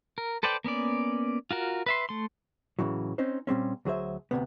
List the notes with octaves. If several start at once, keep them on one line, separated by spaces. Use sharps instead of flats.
A#4
A4 B4 C5 D5 G5
A#3 B3 C#4 D5
F4 F#4 A#4
B4 E5 C6
A3 C6
A2 C#3 E3 F#3
C4 C#4 D#4 C5
A#2 G3 C4 C#4
D2 F#3 G#4 C5 E5
D2 G2 C3 B3